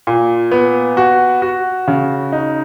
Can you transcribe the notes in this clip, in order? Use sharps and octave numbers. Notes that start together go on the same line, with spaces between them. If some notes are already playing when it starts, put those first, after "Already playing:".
A#2
B3
F#4
F#4
C#3
D#4